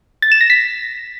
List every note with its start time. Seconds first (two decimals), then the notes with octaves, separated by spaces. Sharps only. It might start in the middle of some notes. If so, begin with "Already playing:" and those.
0.22 A6
0.32 E7
0.41 A#6
0.50 B6